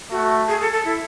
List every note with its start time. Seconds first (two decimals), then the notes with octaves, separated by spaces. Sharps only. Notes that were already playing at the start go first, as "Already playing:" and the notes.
0.11 A3 F#4
0.48 G#4
0.61 A4
0.72 A4
0.85 E4